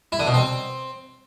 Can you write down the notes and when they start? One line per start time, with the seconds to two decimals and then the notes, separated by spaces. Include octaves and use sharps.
0.12 E4
0.20 D3
0.27 B2
0.34 C4